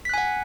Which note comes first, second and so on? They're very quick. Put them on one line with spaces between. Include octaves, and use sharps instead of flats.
B6 F#6 G#5 F#5